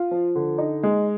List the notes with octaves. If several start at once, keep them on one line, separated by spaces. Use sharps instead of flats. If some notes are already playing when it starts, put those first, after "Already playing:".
Already playing: F4
F3
D3
D#4
G#3